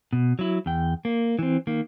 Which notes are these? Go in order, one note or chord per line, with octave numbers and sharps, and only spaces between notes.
B2
F#3 E4
E2 G5
A#3
E3 C4
D#3 A#3